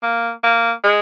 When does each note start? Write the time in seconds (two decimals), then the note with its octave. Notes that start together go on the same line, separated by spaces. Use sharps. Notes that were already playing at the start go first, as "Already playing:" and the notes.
0.03 A#3
0.44 A#3
0.84 G#3